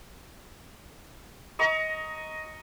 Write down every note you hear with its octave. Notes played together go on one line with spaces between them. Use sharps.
D#5 A#5 C#6